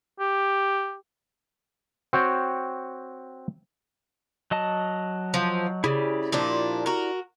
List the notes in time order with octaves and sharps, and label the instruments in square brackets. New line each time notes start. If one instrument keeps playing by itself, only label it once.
[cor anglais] G4
[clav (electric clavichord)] C4 F#4 C#5 G5
[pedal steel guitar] F#3 D#5 A5
[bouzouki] F3
[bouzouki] C#3 [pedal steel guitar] E4 G4 D5
[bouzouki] A#2 F3 D4
F#4 A#4